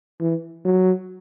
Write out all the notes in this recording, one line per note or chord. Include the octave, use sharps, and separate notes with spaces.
E3
F#3